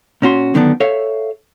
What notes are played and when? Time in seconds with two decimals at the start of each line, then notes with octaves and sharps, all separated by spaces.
0.22 A#2 C#4 F#4 C6
0.54 F#2 D3 D#3 B3 D4
0.80 A4 C#5 E5 F5